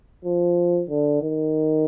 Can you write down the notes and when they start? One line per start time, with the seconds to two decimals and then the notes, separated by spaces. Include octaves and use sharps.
0.24 F3
0.89 D3
1.22 D#3